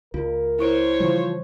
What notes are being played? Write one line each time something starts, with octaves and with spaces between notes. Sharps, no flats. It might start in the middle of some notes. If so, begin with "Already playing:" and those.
C#2 F4 A#4
E4 C5 C#5 C#6 D7
C#3 E3 F3 G3